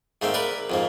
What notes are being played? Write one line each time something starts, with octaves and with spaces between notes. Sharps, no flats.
G#2 A3 A#3 C4
A#4 B4 D5
F2 G#2 A#3